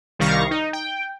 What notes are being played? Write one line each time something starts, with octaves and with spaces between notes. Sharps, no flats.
C2 D#3 G3 F5 C#6 A#6
D#4
G5